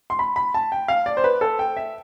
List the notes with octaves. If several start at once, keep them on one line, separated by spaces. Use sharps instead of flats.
C6
B5
B5
A5
G5
F5
D5
C5
B4
A4
G5
E5